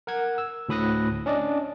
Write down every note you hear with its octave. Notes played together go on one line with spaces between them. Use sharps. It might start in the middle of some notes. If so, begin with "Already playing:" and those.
A#4 F#5 G#6
E6
D2 A2 B5 D#6 F#6 A#6
C#4 D4 D5 D#5